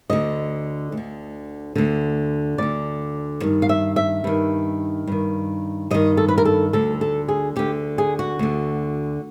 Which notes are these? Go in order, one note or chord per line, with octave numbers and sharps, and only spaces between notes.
D2 D3 D#5
D2
D3
D2 D3
D2 D3 D5
G2 D#3
F5
E5
E5
G2 D#3
G2 D#3
G2 D#3 D#5
A4
B4
A#4
A4
D2 D3 A4
A4
G#4
D2 D3 G4
G#4
F#4
D2 D3